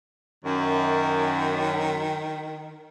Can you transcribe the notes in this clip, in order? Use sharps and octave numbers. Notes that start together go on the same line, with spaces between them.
F#2 D#3